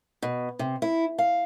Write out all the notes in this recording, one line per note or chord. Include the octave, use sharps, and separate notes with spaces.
B2
C3
E4
F5